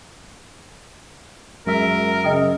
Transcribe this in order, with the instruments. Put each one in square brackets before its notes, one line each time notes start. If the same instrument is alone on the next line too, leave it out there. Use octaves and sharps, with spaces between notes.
[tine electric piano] F#2 E5 [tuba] G#3 [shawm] A#4
[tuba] C#3 [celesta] D#5 G5 D#6